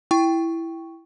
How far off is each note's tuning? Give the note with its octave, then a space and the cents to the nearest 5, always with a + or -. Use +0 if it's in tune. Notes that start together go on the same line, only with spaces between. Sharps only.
E4 +5 G5 +0 C#6 +0